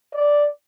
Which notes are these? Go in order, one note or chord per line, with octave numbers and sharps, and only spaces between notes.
D5